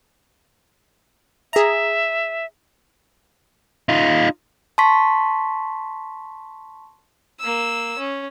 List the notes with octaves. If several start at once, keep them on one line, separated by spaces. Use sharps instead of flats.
G#4 E5 A#5
D#4 F4
A5 C6 C#6 B6
A#3 E6
C#4